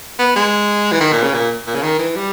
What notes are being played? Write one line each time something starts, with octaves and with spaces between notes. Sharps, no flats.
B3
G#3
E3
D#3
A#2
C#3
A#2
A#2
C#3
D#3
E3
G3